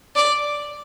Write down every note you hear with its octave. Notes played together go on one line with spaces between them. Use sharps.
D5